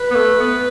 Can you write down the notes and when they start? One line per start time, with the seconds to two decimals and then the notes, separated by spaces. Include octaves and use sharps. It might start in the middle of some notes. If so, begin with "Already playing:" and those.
Already playing: B4
0.10 B3
0.15 A3
0.40 B3